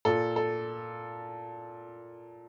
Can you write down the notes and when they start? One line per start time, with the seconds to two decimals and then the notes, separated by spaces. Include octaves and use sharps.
0.05 A#2 A4
0.36 A4